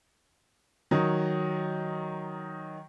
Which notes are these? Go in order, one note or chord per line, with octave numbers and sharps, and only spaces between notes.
D#3 F#3